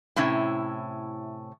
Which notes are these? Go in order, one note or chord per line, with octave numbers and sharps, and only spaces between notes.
A2 C3 C#4 E4